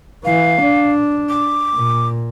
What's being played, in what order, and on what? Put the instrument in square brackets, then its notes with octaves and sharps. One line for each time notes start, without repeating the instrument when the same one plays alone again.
[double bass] E3 [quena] F5
[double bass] D4
[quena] D6
[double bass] A#2